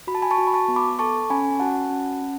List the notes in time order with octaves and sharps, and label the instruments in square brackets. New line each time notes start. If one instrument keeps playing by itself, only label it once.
[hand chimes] F#4 B5
A5
G#5 B5
A5 C#6
F#4
B5
A5 C#6
B3
B5 D6
A4 A5 C#6
C#4 G#5 B5
F#4 F#5 A5
C#4
C#4